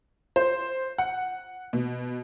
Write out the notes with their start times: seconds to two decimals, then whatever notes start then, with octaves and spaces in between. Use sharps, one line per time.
0.36 C5
0.98 F#5
1.73 B2